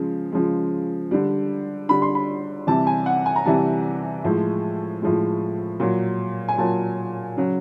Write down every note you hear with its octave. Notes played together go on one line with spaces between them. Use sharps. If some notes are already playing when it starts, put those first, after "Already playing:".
Already playing: C#3 F3 G#3
C#3 F3 G#3
D3 G3
D3 G3 B5
C6
B5
C3 E3 G3 A5
G#5
F#5
G#5
A#5
C3 E3 G3 A5
A2 F3 G#3
A2 F3 G#3
A#2 F#3
G#5
A#2 F#3 A5
C#3 F#3